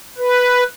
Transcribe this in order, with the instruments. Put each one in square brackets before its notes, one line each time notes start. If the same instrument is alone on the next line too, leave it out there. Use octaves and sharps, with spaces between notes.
[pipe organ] B4